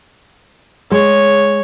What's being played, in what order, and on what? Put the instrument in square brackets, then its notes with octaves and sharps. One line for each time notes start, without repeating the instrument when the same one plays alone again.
[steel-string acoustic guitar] G#3 [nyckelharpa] C#5